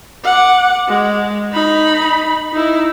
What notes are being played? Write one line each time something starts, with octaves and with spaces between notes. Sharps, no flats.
F#5 D6
G#3
D#4 B5
D#4 E4